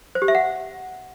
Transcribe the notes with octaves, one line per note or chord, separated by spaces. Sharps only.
C5
G4
E5
F#5